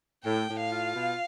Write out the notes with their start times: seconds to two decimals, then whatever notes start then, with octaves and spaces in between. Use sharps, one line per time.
0.24 A2 G5
0.48 A2
0.60 F5
0.72 F4
0.94 B2